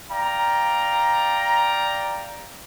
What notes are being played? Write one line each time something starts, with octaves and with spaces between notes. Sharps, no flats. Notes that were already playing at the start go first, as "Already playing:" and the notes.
D5 F5 G5 A#5